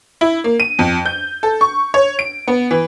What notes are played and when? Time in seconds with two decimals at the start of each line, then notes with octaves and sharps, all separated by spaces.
0.21 E4
0.44 A#3
0.60 D#7
0.79 F2
1.06 G6
1.43 A4
1.61 C#6
1.94 C#5
2.19 D7
2.48 B3
2.71 E3